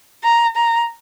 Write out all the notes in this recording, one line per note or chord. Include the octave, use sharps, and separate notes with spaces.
A#5
A#5